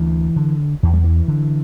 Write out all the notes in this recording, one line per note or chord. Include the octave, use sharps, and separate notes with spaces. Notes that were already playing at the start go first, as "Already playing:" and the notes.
Already playing: D2 E3
D3
E2 E3
G3
E3
D3